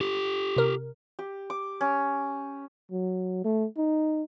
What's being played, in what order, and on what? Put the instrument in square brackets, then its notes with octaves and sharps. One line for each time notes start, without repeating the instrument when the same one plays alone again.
[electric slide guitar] G4 A4
[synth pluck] C3 A#4
[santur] G4
D6
C#4
[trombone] F#3
A3
D#4